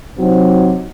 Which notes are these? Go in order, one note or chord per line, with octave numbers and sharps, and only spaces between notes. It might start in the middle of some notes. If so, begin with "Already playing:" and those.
C3 F#3 C4 D#4